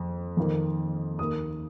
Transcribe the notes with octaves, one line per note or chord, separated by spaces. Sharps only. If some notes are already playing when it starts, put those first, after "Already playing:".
Already playing: F2
F2 D#3 A#3
D#2 D#3 A#3 D#6